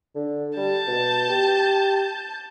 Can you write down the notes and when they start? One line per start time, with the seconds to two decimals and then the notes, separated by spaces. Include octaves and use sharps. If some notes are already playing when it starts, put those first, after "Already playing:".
0.15 D3
0.56 G3 A5 G6
0.87 B2
1.30 G4